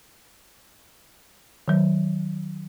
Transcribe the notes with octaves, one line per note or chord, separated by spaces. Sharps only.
D#3 F#3